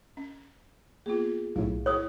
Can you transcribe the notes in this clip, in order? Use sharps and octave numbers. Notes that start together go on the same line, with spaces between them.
C#4
A#3 B3 F4 G#4
B1 A2 F5
E4 G#4 C#5 D#6